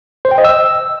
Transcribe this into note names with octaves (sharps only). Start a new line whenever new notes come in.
C5
G5
D#5
E6